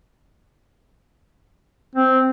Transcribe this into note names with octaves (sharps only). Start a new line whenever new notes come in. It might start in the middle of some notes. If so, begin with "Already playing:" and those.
C4